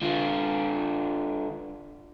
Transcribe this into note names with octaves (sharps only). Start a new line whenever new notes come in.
D3 F4